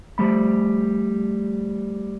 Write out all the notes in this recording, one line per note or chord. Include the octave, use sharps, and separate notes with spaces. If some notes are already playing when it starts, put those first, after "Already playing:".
F3 G3 A3 B5